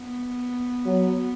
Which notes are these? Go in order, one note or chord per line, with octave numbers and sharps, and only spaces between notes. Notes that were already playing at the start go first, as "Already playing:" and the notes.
Already playing: B3
F#3